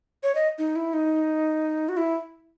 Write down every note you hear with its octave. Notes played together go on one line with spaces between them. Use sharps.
C#5
D#5
D#4
E4
D#4
F#4
E4